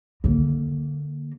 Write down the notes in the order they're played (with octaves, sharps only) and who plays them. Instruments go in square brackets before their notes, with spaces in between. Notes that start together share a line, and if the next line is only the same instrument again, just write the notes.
[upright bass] D3 A#3